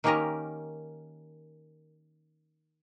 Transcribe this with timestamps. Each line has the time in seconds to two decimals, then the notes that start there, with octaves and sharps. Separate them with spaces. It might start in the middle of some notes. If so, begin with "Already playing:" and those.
0.04 D#3 A#3 C#4 G4 A#4 D#5